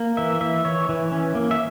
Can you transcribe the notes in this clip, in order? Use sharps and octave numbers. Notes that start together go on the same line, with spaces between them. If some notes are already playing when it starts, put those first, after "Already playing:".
Already playing: A#3
E3 E5
E3 E5
E3 C#5
E3
C#4
A#3
E5